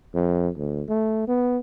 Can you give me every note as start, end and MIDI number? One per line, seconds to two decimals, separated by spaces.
0.14 0.49 41
0.57 0.83 38
0.89 1.28 57
1.28 1.58 59